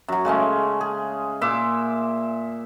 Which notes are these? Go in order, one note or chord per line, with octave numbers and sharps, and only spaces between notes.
F#2 F#3
C#3 G#3 A3 C#4
G#4
A#2 E5 C6 D6